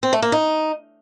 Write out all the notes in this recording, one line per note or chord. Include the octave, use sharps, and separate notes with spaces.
C4
A3
A#3
D#4